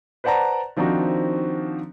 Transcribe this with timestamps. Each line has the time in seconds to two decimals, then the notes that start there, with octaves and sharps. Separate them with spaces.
0.24 B4 C5 D5 F#5 A5 A#5
0.77 D#3 F3 C4 D4 D#4 F#4